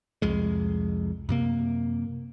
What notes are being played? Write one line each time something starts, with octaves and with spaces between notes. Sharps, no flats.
C2 F2 G#3
F#2 C3 A#3